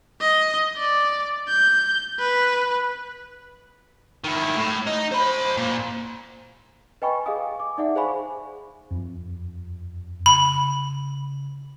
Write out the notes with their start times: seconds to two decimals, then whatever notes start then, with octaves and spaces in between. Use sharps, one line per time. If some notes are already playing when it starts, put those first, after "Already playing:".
0.21 D#5
0.77 D5
1.48 G6
2.19 B4
4.24 D#3 E4
4.57 A2
4.87 D#4
5.12 C5 B5
5.57 A#2
7.02 B4 D#5 G5 G#5 B5 C#6
7.26 G#4 D#5 F5 G#5 D#6
7.60 D6
7.78 D#4 D5 E5 F#5
7.95 G#4 C5 F5 G#5 B5 C#6
8.91 F2
10.26 C#3 B5